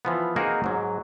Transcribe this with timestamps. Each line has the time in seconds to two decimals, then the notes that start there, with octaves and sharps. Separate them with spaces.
0.05 E3 F3 B3
0.36 A#3 C4 D#4 F#4 G#4 A#4
0.64 G#2 F#3